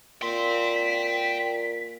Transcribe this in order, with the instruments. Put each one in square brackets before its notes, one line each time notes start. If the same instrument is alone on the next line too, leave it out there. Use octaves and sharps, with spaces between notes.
[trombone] A#2 [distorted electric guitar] G5 C6 [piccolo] B6